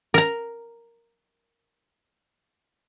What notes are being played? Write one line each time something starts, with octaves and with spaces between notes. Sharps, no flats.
A#4 A#5